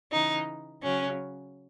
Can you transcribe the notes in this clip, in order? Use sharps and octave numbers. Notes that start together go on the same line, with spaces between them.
C#3 E3 D#4
C#3 F#3 C#4